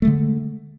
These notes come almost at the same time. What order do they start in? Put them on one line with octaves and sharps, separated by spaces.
A3 G#3 D3